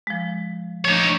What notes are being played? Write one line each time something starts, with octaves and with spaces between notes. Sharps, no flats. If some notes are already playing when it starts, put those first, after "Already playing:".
F3 G#3
F3 A3 D4 D#4 C#5